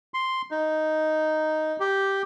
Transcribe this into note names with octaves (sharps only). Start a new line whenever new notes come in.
C6
D#4
G4